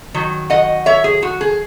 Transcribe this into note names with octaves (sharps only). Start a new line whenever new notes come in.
D#3 F#3
D#5 F#5
C#5 E5
G#4
F#4
G#4